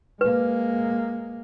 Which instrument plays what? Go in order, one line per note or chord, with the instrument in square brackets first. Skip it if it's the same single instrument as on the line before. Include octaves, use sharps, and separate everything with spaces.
[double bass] G#3 A#3 [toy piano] B4